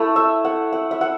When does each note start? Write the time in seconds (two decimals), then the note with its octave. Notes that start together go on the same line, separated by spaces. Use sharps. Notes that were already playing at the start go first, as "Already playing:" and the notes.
Already playing: A3 E4
0.16 E5
0.45 F#5
0.73 F#5
0.91 E5
1.01 F#5